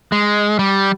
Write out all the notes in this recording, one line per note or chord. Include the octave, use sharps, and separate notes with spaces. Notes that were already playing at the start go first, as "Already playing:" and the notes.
G#3
G3